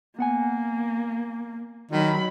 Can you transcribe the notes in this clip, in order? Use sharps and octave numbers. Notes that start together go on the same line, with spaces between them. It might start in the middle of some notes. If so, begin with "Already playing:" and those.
A#3 B3 F#5 G#5
D#3 F#3 B5